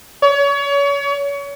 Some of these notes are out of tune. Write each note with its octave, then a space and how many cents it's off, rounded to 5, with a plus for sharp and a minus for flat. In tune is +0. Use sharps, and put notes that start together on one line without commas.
C#5 +30